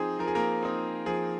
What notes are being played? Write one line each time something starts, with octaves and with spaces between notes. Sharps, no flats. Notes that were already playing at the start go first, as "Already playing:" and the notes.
Already playing: F3 C4 D#4 G#4
F3 A#4
G#4
A#3 A#4
C4 D#4
F3 G#4